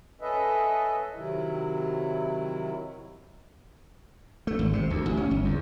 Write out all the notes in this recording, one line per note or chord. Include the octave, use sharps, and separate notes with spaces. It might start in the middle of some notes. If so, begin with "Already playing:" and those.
C#4 A4 B4 D#5 E5
C3 D#3 F#3 E4
A3
G#1
C3
D2
A1
C#4
G1
E2